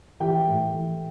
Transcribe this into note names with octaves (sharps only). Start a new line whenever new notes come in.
E3 G4 G5
A2
E3